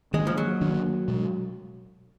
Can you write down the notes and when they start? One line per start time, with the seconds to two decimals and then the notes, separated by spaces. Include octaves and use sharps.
0.14 D#3 G#3 A#3 D4
0.27 F3
0.38 F#3
0.61 D#3 A#3 D4
1.08 B2 G#3